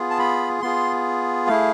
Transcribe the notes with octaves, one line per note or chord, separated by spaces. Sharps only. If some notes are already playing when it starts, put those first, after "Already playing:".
Already playing: B3 F4 G#4
A5
B5
B3 F4 G#4 C6
A3 E4 G#4 F5